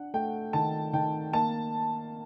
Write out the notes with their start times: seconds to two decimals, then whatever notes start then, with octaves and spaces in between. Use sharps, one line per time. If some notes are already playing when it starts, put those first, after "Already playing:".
Already playing: D4 F#5
0.14 A3 G5
0.53 D#3 A5
0.93 D#3 G5
1.33 A#3 A5